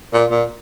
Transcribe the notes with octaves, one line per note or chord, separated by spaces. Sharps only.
A#2
A#2